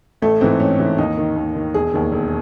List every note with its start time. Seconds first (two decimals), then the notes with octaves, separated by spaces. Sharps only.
0.22 A1 A3
0.41 G#2 E3 C4
0.60 A1 C#4
0.79 G#2 E3
0.98 D#2 D#4
1.18 D#3
1.36 D#2
1.56 D#3
1.74 E1 G#4
1.94 D#2 D#3
2.13 E1